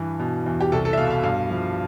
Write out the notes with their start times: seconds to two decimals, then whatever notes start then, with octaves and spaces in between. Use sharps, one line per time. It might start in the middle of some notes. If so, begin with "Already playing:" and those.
Already playing: G2 E3
0.19 B2
0.46 E2
0.61 G4
0.72 C2 A4
0.85 A4
0.93 E5
0.97 B2 F5
1.11 F5
1.23 G2 F5
1.50 F3